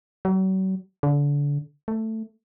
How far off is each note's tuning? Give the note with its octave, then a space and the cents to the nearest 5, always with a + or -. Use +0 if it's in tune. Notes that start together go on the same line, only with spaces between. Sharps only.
F#3 +40
D3 -30
A3 +10